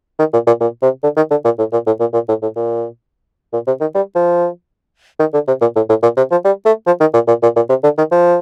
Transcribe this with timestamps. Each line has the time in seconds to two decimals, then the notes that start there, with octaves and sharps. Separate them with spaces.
0.19 D#3
0.33 A#2
0.47 A#2
0.61 A#2
0.82 C3
1.03 D3
1.16 D#3
1.31 D3
1.45 A#2
1.58 A2
1.73 A#2
1.86 A2
2.00 A#2
2.13 A#2
2.28 A2
2.42 A2
2.56 A#2
3.53 A#2
3.67 C3
3.81 D#3
3.95 G3
4.15 F3
5.20 D#3
5.33 D3
5.47 C3
5.61 A#2
5.76 A2
5.89 A2
6.03 A#2
6.17 C3
6.31 F3
6.45 G3
6.65 A3
6.87 F3
7.00 D#3
7.14 A#2
7.28 A#2
7.43 A#2
7.56 A#2
7.69 C3
7.84 D3
7.98 D#3
8.11 F3